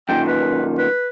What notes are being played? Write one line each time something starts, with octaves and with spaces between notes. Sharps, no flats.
F#2 A#2 D#3 G5
B4
B4